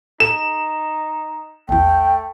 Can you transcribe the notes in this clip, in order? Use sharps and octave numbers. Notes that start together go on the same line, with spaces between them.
D#4 A4 E7
A#1 E2 A3 G5